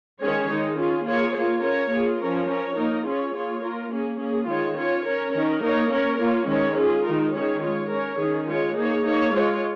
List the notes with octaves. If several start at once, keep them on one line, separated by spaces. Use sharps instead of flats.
D#3 G#3 C#4 G#4 C#5
D#3 G#3 D#4
C#4 F4 G#4
A#3 F4 G#4 C#5
A#3 F4 C#5
C#4 A#4 C#5
A#3 F4 G#4
F3 C#4 A#4 C#5
C#4 A#4 C#5
A#3 D#4 A#4
C#4 F4 G#4 C#5
A#3 F4 G#4 C#5
A#3 F4 A#4
A#3 C#4 G#4
A#3 C#4 G#4
D#3 G#3 F4 C#5
C#4 F4 C#5
C#4 A#4 C#5
D#3 C#4 A#4
A#3 D#4 A#4 C#5
C#4 A#4 C#5
A#3 F4 C#5
D#3 G#3 C#4 A#4 C#5
C#4 F4 G#4
D#3 G#3 D#4 A#4
D#3 C#4 G#4 C#5
G#3 F4 C#5
C#4 A#4 C#5
D#3 C#4 G#4
G#3 F4 C#5
A#3 D#4 G#4 C#5
A#3 D#4 C#5
G#3 F4 C#5